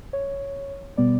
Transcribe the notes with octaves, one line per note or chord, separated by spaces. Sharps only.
C#5
B2 G3 B3 D5